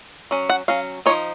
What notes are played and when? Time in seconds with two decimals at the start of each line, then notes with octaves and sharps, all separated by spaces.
0.31 F#3 C#4
0.50 F#5
0.68 F#3 C#4 F5
1.06 F3 A#3 D#4 C#5